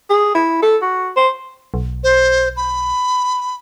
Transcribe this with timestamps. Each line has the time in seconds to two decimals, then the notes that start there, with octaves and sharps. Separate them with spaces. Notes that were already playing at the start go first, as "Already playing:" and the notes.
0.10 G#4
0.35 E4
0.63 A4
0.82 F#4
1.17 C5
1.74 B1
2.04 C5
2.57 B5